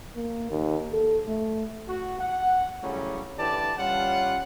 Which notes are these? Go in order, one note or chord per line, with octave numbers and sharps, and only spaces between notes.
A#3
D#2
A4
A3
F#4
F#5
A2 C#3 F#3 G3 C#4
D3 E3 G4 D5 A5
G3 C#4 F4 F#5